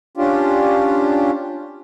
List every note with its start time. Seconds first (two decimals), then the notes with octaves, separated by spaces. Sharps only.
0.17 C#4 D4 F4 G4